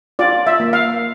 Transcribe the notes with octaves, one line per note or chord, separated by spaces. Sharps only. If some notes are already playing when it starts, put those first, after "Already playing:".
F4 D5
E5
A#3
F5